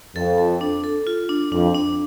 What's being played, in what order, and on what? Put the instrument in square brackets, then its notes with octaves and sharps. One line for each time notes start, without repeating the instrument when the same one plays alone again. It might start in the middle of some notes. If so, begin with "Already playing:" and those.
[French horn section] F2 [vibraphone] A4
[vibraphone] A4
D4
A4
F4
D4
[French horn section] F2 [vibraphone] D4
[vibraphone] D4